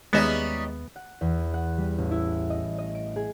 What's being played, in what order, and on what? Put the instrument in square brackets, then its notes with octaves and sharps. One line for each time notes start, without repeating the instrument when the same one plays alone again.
[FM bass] D#2 [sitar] G3 C#4 D#4 [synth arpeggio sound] G#3 D#5 [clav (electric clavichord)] B3 E5
[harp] F#5
E2
F#5
G3
A1
E4
D#5
D#5
D7
G#4